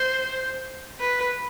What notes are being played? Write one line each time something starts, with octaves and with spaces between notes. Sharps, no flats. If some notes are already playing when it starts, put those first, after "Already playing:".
Already playing: C5
B4